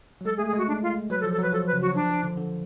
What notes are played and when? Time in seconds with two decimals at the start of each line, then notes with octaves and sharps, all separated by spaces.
0.21 F#3
0.25 G#3 A4
0.36 G#4
0.39 A3
0.46 G#4
0.53 G#3 F#4
0.67 D4
0.82 F4
1.10 F#3 B4
1.20 A4
1.24 F3
1.32 A4
1.39 F#3 B4
1.52 F3 A4
1.66 B4
1.73 C#3
1.81 F#4
1.88 F#3
1.95 F3 D4
2.09 F3
2.24 D3
2.37 D3